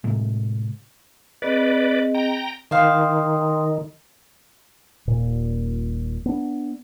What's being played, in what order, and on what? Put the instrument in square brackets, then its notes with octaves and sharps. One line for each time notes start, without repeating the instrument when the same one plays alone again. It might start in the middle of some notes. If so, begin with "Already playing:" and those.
[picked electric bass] A2 C3 G#3
[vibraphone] C4 G#4 D#5 [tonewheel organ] B4 D5
[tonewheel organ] G5 A#5
[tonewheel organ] D#3 [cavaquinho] C5 F5 [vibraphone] G5 C6 D#6
[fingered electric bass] D#1 A#2
B3 D4